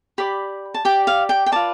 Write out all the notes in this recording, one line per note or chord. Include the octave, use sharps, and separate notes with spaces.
G4 D5 B5
A5
G4 D5 G5
F5
G5
G5
F4 B4 D5 A5